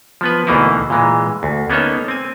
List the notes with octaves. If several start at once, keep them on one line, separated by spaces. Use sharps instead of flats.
F3 B3 B4
D2 B2 E3 A#3 D#4 E4
A#2 E3 G#3
D2
A#3 B3 C#4 D#4 A4 C#5
C4 G#5